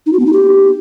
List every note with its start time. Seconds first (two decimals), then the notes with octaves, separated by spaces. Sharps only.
0.06 D#4
0.13 F#4
0.20 B3
0.26 D#4
0.33 G4